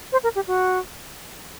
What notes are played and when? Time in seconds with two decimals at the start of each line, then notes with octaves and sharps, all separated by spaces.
0.12 C5
0.24 A#4
0.35 G4
0.47 F#4